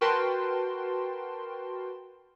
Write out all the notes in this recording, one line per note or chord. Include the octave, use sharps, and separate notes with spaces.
F#4 A#4 B4 G5 A5 C6